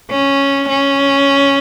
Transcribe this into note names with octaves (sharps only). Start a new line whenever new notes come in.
C#4
C#4